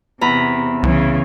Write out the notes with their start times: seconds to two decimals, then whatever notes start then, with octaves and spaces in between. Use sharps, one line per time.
0.21 E2 C3 A#5 B5
0.83 C2 C#3 E3